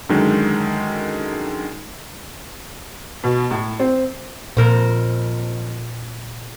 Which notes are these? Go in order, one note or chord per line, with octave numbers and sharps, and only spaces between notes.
F#2 D3 D#3 G#3
B2
A2
C4
F2 A#2 A#4 C5